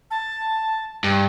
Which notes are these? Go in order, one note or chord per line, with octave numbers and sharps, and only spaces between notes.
A5
G2